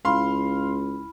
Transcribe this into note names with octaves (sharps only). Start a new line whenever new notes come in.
C#2 E4 F5 B5 C6 F6